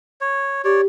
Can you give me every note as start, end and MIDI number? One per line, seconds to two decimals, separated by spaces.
0.21 0.62 73
0.65 0.87 67
0.65 0.81 73
0.65 0.81 74